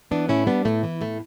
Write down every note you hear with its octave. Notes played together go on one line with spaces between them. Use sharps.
E3 B3 D4
A2 C#4 E4
G3 B3 D4
A2 A3
E3
A2 A3